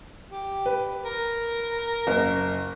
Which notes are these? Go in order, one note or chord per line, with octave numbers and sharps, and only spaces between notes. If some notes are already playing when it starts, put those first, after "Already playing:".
G4
B4
A#4
F#1